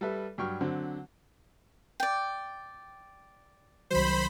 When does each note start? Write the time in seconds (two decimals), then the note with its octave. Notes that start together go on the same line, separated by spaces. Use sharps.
0.01 G3 A4 B4 E5
0.38 G2 F#3 G5 C#6 F6
0.61 D3 F#3 C4
2.00 D5 G5
3.90 C2 D#3 F#3 C5 B5